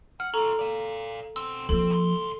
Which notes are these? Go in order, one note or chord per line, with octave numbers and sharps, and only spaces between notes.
F#5 F6
C#4 F4 A4 A#5
D5 F5
B2 C4 E6
F3 A#3 C4 A4
C#2 C6